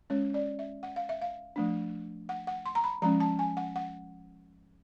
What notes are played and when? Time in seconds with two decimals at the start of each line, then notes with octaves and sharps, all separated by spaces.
0.10 G#3 C#4 C#5
0.34 D5
0.59 E5
0.83 F#5
0.96 F5
1.09 E5
1.22 F5
1.56 F3 A3 D4
2.29 F#5
2.47 F#5
2.66 C6
2.75 A#5
2.84 B5
3.02 F3 G#3 C#4 A#5
3.20 A5
3.39 G#5
3.57 F#5
3.76 F#5